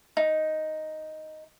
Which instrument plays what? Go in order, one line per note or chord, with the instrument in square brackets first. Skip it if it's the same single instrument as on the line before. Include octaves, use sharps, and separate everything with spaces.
[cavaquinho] D#4